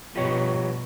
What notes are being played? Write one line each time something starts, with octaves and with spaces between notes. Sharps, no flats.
G2 B2 F3 G4 C#5